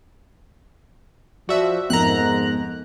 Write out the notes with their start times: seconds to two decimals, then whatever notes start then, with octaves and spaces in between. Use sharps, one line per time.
1.49 F3 F#4 D5 E5
1.90 F2 G#2 B3 A#4 A#5 F#6